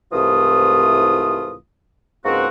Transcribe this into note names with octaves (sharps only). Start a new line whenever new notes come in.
C2 G#2 E3 A3 F4 D#6
C#2 G#2 A#3 C4 F#4